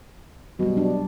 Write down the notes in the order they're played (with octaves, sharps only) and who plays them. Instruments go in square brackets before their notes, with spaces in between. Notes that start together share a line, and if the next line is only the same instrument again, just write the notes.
[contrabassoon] B2 [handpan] F#3 G3
[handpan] D4